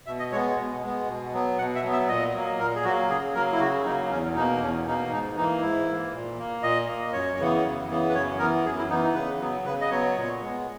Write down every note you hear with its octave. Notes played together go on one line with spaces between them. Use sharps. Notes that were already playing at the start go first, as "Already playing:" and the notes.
B2 E5
D#5
G#3 B3 C#5
B2
G#3 B3
B2
F#3 B3
B2 F#5
E5
F#3 B3
E5
A#2 D#5
F#3 A#3
A#2 A#4
G#4
F#3 A#3 F#4
C#3 G#4
F#3 A#3 A#4
E4
C#3 F#4
F#3 A#3 D#4
E2 C#4
B2 A#3 D#4
E2 C#4
B2 A#3 D#4
G#2 D#4
E3 A#3 D#4
G#2 E4
E3 A#3
A#2
A#3
A#2 D#5
A#3
F#2 C#5
C#3 E3 B3
F#2
C#3 E3 B3
B4
F#2 C#5
E3 B3 A#4
F#2 G#4
E4
E3 B3 D#4
D#4
C#3 B4
F#3 B3
C#3 B4
D#5
F#3 B3 C#5
A#2
G#3 B3